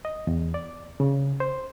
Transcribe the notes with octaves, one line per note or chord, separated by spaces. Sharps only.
D#5
E2
D5
C#3
C5